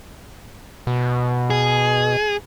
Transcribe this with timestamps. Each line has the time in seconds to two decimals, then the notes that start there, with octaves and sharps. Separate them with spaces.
0.87 B2
1.50 G#4